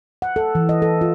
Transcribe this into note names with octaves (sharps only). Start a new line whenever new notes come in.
F#5
A4
E3
D#5
A4
F4